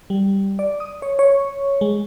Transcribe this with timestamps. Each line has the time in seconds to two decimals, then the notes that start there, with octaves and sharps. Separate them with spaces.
0.10 G3
0.59 D5
0.80 D#6
1.02 C#5
1.19 C#5
1.81 G#3